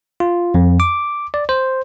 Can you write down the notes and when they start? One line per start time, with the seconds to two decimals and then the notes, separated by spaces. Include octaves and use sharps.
0.20 F4
0.54 F2
0.80 D6
1.34 D5
1.49 C5